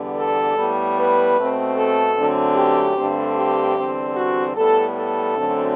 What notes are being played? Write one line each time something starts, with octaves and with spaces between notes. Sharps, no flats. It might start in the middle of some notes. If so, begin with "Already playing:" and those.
Already playing: E2 D3 G3 B3
A4
A2 G3 B3
B4
B2 A3 C4
A4
F#2 D3 F#3 A3 C4
G4
G2 D3 A3 C4
G4
E2 D3 G3 C4
F#4
A2 G3 B3 A4
A4
F#2 D3 F#3 A3 C4